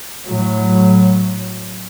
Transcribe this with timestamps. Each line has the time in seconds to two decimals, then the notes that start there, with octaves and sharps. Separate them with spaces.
0.25 A2 F#3